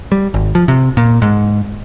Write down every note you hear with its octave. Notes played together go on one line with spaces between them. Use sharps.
G3
G#1
F3
C3
A#2
G#2